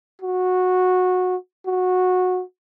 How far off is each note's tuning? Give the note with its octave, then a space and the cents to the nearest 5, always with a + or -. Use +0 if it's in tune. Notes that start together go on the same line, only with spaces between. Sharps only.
F#4 -15
F#4 -15